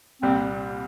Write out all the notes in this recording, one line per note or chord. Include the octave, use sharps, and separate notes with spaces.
C2 A#2 G3 C4